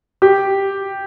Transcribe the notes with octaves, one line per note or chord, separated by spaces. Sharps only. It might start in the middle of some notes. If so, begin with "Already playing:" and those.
G4